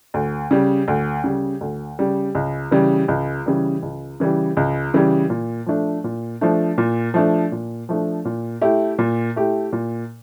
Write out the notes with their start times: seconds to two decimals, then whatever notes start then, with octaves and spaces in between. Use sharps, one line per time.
0.14 D2
0.51 C#3 G3
0.88 D2
1.24 C#3 G3
1.61 D2
1.99 C#3 G3
2.35 C#2
2.71 C#3 E3 G3
3.08 C#2
3.46 C#3 E3 G3
3.82 C#2
4.20 C#3 E3 G3
4.57 C#2
4.94 C#3 E3 G3
5.30 A#2
5.66 F3 A3 D4
6.04 A#2
6.41 F3 A3 D4
6.78 A#2
7.14 F3 A3 D4
7.52 A#2
7.89 F3 A3 D4
8.25 A#2
8.61 A3 E4 G4
8.99 A#2
9.36 A3 E4 G4
9.73 A#2